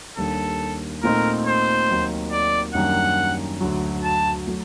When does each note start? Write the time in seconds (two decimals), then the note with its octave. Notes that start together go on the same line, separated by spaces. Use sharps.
0.17 D#2 D#3 G3 D4 A4
1.03 A#2 A3 C4 D#4 A#4
1.46 C5
1.89 D#2 D#3 F#3 C4
2.32 D5
2.75 F#2 D#3 G3 A#3 D4 F#5
3.61 D2 D3 F#3
4.04 A5
4.47 F#3 A3